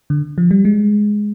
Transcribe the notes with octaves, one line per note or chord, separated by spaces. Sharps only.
D3
F3
G3
G#3